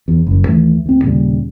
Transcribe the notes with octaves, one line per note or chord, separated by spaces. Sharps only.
E2
F#1 F#2
D#2 E3 A3
D2 C4
D#2 A#2 C#3 G3